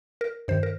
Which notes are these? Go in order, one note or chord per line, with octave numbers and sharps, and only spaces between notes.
A#4
G2 D#3 C5
A#4